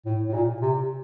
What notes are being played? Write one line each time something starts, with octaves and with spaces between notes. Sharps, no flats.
A2
A2
A#2
C3